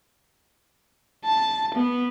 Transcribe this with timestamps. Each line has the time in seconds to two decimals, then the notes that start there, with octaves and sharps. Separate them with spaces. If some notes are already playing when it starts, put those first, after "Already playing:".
1.25 A5
1.75 B3